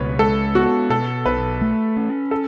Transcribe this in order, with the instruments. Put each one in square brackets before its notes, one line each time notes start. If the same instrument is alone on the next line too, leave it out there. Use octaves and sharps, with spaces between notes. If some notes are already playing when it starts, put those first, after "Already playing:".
Already playing: [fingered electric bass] C#2 B2 [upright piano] B4 C#5
[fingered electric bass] G#3 [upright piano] A4
[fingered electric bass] B3 [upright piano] F#4
[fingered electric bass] B2 [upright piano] A4
[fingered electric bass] B1 [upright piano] B4
[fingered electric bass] A3
C#4
[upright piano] A4